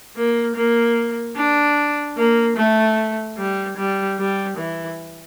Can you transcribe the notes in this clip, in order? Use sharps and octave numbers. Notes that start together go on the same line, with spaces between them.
A#3
A#3
D4
A#3
A3
G3
G3
G3
E3